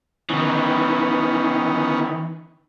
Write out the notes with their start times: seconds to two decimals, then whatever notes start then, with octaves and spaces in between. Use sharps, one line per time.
0.29 D#3 E3 B3 C#4 D#4